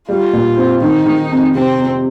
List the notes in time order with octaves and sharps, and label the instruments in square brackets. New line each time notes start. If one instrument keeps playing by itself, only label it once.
[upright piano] G3 [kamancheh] F4
[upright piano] A#2
C4
[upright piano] D#3 [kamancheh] D#4
[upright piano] D#3
F2
[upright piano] C3 [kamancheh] C4
[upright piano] F2